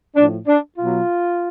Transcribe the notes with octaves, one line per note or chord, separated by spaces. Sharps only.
A2 F3 D4
D4
B2 F#3 F4